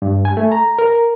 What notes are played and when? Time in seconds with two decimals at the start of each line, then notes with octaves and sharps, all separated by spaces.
0.02 G2
0.25 G#5
0.37 A3
0.52 A#5
0.79 A#4